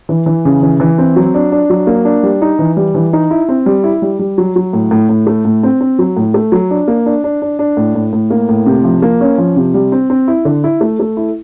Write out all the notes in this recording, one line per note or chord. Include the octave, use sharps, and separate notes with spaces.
E3
E3
C#3
E3
E3
C4
F#3
D4
D4
F#3
A#3
D4
G3
D#4
E3
G3
E3
D#4
E4
C4
G3
E4
G3
G3
F#3
F#3
A2
A2
A2
A3
A2
C4
C4
F#3
A2
A3
F#3
D4
A#3
D4
D4
D4
D4
A2
A2
A2
A#3
A2
C3
F3
A#3
C#4
F3
C3
G3
C4
C4
E4
D3
E4
A3
A3
E4